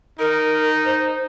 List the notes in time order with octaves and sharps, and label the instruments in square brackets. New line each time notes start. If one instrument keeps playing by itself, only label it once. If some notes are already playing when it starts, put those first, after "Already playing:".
[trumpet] D#4 [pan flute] A#4
[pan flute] C5